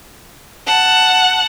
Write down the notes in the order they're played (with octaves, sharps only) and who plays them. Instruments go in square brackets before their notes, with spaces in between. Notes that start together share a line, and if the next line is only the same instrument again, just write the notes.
[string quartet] F#5 A5